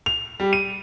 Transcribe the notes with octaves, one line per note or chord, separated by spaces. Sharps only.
F7
G3
D#7